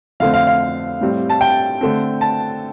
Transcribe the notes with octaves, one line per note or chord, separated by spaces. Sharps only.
F2 D3 A3 C4 F5
F5
F5
A2 G3 C4
A5
G5
D3 A3 C4
A5